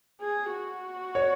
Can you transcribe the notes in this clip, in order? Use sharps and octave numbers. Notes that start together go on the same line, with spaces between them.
G#4
F#4
C#5